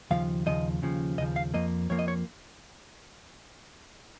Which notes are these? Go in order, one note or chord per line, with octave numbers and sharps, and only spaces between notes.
D#2 C#3 F3 F5
D#2 C#3 F3 D#5
D#2 C#3 F3
D#2 C#3 F3 D#5
F5
F2 F3 A#3 D#5
F2 F3 A#3 C#5
D#5
C#5